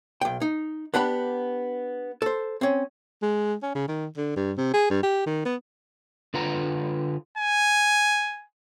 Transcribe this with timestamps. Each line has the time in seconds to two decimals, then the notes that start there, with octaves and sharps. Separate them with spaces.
0.21 B1 G5
0.41 D#4
0.94 B3 D4 G4 F#5 B5
2.22 A4 C5
2.61 C4 C#4
3.22 G#3
3.63 C#4
3.75 C#3
3.88 D#3
4.17 D3
4.36 G2
4.57 C3
4.74 G#4
4.90 G2
5.03 G4
5.26 D#3
5.45 B3
6.34 D3 F4 B4 F#5 A#5
7.38 G#5